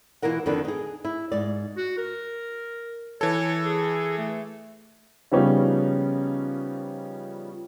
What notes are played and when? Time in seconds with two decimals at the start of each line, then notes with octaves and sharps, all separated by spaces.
0.22 B2 E3 E4 F4 A#4 F#5
0.46 F2 D3 D#3 D4 B4
0.65 D#4 G#4
1.05 E4
1.32 G#2 D5
1.77 F#4
1.97 A#4
3.21 E3 A4 C#5
3.64 G#4
4.18 A3
5.32 C#3 F3 G3 B3 C#4 D#4